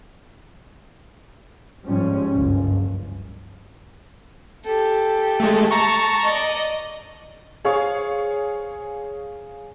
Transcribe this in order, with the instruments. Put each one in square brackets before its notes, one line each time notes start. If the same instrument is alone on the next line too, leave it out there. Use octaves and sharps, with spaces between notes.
[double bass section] G#2 F3 G3 C#4
F#1 C#2 G2
[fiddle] G4 A4
[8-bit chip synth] G#3 A3
A5 A#5 C#6
[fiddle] D5 D#5
[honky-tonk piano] G#4 C5 C#5 F5 C#6